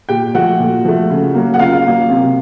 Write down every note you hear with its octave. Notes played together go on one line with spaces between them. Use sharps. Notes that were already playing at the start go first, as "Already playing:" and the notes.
A#2 G4 G5
F3 A3 F#4 F#5
A#2
F3 A3
C#3
F#3 A#3
F#5
C#3 F4 F5
F#3 A#3
C3